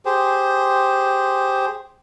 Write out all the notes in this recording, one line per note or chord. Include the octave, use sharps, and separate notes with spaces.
G4 G#4 C5